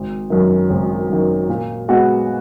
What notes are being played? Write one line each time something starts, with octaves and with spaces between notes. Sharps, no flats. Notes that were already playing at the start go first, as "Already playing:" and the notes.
Already playing: G#1
F#2 D#3
G#1
F#2 D#3
A#2
G#3 B3 F#4